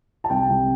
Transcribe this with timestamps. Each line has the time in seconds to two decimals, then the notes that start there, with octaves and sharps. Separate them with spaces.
0.24 A5
0.30 C2 G5
0.49 C2